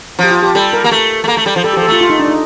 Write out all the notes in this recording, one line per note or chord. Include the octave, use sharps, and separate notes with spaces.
F3 G4
F4
G4
G3 A4
A#4
A#3
A3
A3
A#3
A3
G3
F3
G3 A4
G4
F3
A4
A3 F4
F4
D#4
D4
D#4